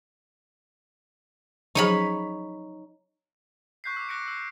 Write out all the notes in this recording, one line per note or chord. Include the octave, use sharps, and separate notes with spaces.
F3 F#3 D#4 G#4 C#5 B5
C#6 F#6 G6 B6 C7
D6 E6
D6 F#6 A#6 C#7 D7
E6